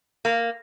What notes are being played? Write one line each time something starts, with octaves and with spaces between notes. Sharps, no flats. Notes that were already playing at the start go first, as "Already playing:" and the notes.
A#3